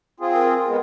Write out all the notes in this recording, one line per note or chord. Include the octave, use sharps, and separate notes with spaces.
C4 F4 G#4
A#4
G#3 B3